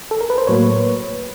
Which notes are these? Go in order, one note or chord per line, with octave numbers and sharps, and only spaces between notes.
A4
A#4
B4
C5
A2 F#3 A#3 B4 C#5